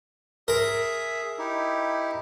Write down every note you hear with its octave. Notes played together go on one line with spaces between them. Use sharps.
G#4 A#4 E5
D#4 E4 G4